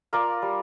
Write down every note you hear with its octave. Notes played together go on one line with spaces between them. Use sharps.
F4 A#4 D5
G3